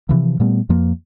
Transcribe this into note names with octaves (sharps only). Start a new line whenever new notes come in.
C3 E3 F3
A#2 G3 A3 B3
F2 F3 A#3